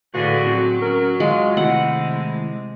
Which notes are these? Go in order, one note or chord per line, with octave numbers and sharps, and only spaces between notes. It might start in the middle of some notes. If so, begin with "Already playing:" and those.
A2 D3 A3 F#4 G#4 B4 F5
F#3 C4
C#4 A#4
G#3 F4 G#5
C3 D#3 G#3 A3 E4 F#5